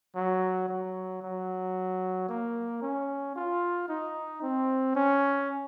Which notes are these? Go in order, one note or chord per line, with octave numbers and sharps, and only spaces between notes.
F#3
F#3
F#3
A#3
C#4
F4
D#4
C4
C#4